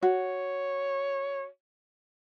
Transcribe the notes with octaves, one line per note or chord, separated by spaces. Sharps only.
F#4 C#5